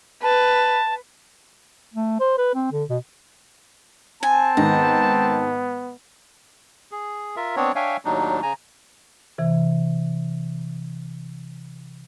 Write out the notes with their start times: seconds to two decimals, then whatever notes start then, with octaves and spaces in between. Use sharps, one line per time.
0.23 B4 A5
1.94 A3
2.20 C5
2.38 B4
2.55 C4
2.72 D3
2.90 B2
4.23 C4 G#5 A5
4.57 G#2 D#3 B3 A#5
6.91 G#4
7.36 F4 A#4 E5
7.56 B3 C4 D4 C#5
7.76 D4 C#5 E5 F5 G5 G#5
8.05 D#2 A2 F#3 D4 D#4
8.43 C#3 G#5 A#5
9.38 C3 E3